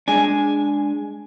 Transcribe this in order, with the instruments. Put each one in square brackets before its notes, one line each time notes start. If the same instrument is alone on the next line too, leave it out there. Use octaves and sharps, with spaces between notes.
[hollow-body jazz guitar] G#3 D4 [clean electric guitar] G#5